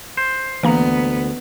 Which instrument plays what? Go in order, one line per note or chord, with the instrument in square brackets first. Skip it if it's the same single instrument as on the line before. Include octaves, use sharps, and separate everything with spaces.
[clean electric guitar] C5
[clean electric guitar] D2 [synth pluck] E3 A#3 A#5 [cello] B3